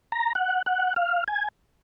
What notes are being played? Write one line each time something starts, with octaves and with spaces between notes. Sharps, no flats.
A#5
F#5
F#5
F5
G#5